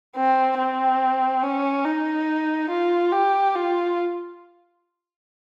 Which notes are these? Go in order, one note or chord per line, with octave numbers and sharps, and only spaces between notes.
C4
C4
C#4
D#4
F4
G4
F4